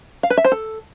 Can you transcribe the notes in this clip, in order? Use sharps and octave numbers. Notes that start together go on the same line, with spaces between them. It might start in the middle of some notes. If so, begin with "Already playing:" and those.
F5
B4
E5
C5
A4